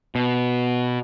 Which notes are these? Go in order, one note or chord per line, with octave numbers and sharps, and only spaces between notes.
B2